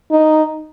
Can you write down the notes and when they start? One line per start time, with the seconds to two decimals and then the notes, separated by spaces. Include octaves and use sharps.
0.11 D#4